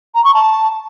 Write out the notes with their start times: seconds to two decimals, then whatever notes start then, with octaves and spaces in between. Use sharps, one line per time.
0.15 A#5
0.24 C#6
0.34 A5